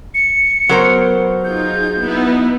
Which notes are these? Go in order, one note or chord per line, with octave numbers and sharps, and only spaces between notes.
C#7
F#3 B3 A#4 C5
D#4 F4 G#4 G6
B3 D#4 E4